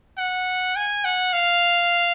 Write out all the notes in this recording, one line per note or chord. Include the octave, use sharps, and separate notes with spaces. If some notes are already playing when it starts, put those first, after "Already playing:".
F#5
G#5
F#5
F5